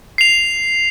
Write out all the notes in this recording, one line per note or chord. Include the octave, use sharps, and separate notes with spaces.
C7 F7